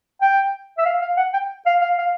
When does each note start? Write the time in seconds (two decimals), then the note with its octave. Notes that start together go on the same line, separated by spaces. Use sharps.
0.22 G5
0.78 E5
0.85 F5
1.02 F5
1.17 F#5
1.33 G5
1.66 F5
1.81 F5
1.98 F5